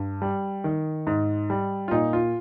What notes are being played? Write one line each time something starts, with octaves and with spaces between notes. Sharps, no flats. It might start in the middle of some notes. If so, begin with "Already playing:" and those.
Already playing: G2
G3
D#3
G#2
G3
F4
A#2 D#4
F4